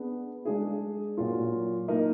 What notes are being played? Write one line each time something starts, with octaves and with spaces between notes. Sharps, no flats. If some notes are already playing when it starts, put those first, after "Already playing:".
Already playing: B3 D4 G#4
G#3 D4 G#4
A#2 F#3 A#3 F4
A#3 D#4 A#4 D#5